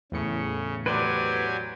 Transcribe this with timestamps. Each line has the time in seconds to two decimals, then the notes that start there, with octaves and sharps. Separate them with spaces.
0.12 E2 A2 C#3 C#7
0.86 F#3 G4 B4 C5 D5 G#5